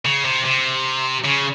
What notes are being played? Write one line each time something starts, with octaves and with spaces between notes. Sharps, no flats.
C#3
C3
C3
C#3